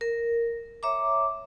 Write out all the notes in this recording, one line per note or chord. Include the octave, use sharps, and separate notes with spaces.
A#4
C#5 E5 A#5 D6